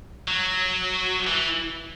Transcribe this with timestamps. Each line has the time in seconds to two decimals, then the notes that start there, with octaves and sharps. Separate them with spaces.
0.28 F#3
1.27 E3